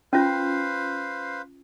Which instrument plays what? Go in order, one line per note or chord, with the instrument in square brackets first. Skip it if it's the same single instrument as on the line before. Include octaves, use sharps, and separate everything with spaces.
[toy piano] C#4 F4 [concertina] B4 C5 F5